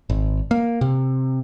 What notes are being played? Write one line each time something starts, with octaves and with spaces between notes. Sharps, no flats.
G#1
A#3
C3